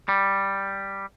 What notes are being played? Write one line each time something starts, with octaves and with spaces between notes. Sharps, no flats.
G3